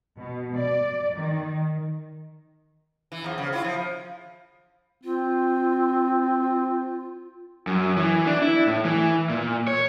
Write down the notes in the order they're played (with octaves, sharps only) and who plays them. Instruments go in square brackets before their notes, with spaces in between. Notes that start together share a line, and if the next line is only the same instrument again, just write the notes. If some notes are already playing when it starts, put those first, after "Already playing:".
[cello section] B2
D5
D#3
[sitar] E3
E2 F3
C#3
B3 E4 F4
F3
[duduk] C4 [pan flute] F4
[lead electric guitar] F#2
E3
D4
E4
A2
E3
A#2
C#5